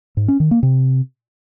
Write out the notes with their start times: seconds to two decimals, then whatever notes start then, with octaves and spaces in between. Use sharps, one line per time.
0.17 G#2
0.28 C#4
0.40 D#3
0.51 A#3
0.63 C3